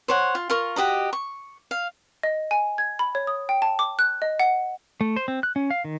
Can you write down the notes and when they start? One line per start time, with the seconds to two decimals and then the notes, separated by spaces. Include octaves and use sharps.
0.08 C5 C#5 F#5
0.35 F4
0.50 F4 A#4 C#6
0.76 F#4 G4 D#5 A#5
1.13 C#6
1.71 F5
2.23 D#5
2.51 G#5
2.78 G#6
2.99 B5
3.15 C#5
3.27 D#6
3.49 G5
3.62 A5
3.79 D6
3.99 F#6
4.22 D#5
4.40 F#5
5.01 A3
5.16 C5
5.28 C4
5.43 F#6
5.56 C#4
5.70 F5
5.85 D#3